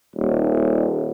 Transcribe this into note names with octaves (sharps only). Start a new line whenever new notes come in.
D#1